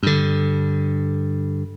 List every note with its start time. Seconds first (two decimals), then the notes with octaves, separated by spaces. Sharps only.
0.03 G2 D3